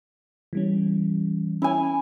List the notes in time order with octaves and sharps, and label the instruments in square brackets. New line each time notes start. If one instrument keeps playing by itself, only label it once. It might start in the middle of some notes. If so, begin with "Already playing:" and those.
[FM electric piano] E3 G3 C#4
[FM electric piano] C#4 [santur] E4 G#5